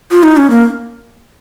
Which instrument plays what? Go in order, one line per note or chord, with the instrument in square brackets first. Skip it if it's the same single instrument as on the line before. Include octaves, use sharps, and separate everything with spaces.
[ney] F4
D#4
C#4
A#3